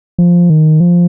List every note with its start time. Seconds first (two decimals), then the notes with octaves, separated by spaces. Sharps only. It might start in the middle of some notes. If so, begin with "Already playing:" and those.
0.18 F3
0.50 D#3
0.80 F3